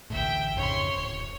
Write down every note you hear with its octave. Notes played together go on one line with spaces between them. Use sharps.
A1 D2 A2 E5 G5
F2 G#2 C#3 C#5 C6
D1 C#5